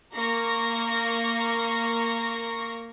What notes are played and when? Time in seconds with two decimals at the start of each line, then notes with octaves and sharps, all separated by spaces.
0.14 A#3 C#6 A#6